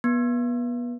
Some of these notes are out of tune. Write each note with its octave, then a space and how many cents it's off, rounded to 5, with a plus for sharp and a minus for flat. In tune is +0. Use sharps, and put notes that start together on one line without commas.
B3 -30